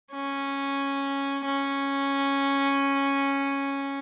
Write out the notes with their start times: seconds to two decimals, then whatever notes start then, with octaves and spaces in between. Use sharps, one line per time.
0.12 C#4
1.45 C#4